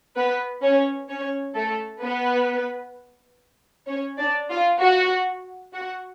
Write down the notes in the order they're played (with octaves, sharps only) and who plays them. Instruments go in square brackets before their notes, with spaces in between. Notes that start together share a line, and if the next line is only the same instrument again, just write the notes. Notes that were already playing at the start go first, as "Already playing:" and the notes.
[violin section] B3 B4
C#4 C#5
C#4 C#5
A3 A4
B3 B4
C#4 C#5
D4 D5
F4 F5
F#4 F#5
F#4 F#5